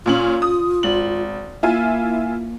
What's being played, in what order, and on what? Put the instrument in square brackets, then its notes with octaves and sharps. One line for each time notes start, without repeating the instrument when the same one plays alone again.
[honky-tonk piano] A#2 C#4 F#7 [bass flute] F4
[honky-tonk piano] D#6
G#1 F#7
[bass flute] A#3 [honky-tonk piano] E4 F4 G#5